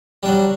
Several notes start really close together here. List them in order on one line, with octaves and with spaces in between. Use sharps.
G3 D4 F#3